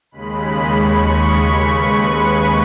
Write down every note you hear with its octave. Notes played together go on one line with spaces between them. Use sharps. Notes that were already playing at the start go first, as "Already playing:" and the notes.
D#2 C#3 G#3 B5
C#6
B4
B4